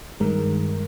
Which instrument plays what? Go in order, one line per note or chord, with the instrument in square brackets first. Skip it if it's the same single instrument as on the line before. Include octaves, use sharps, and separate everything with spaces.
[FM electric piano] G2 D#3 G#3 A#4